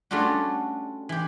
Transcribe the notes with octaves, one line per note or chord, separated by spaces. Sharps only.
G3 A3 C#4 D4 F4 F#4
E3 G4